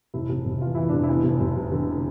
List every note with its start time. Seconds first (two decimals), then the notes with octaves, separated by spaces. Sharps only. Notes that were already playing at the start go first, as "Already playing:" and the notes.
0.14 F1 E4
0.29 F1
0.45 F1
0.61 E3 F4
0.75 E3 E4
0.89 F1 D4
1.03 E4
1.09 E2
1.24 F1
1.40 F1
1.56 F1
1.72 D3